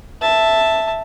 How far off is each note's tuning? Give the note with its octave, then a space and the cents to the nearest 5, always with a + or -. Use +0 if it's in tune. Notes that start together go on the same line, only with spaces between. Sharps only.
E5 +0 A5 +0